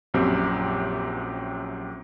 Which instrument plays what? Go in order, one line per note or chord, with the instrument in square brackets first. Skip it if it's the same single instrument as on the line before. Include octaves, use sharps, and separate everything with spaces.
[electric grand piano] A#1 F#2 C4 G4